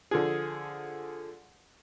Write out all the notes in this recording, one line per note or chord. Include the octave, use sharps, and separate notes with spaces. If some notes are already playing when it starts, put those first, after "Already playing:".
D3 F3 G#4